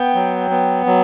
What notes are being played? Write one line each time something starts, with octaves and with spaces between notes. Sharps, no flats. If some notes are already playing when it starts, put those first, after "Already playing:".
Already playing: B3 G5
F#3
B3
F#3